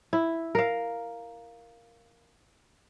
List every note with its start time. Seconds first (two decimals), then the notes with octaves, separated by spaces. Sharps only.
0.13 E4
0.55 A#4 F5